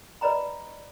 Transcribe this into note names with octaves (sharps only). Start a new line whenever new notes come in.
B4 D5 D#5 A#5 B5